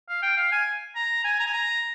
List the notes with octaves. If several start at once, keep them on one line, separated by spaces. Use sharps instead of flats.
F5
G5
F5
G#5
A#5
G#5
A#5
G#5
A#5